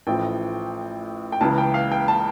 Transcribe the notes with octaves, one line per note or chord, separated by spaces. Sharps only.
A1 A2 F3 G5
G5
C#2 C#3 E3 A5
G5
F5
G5
A5